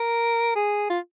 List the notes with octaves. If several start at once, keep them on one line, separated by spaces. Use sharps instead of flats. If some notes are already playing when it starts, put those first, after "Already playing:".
Already playing: A#4
G#4
F4